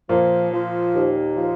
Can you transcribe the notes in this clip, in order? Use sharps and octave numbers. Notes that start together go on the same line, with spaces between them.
A#2 F3 A#3
F3
D#2
F3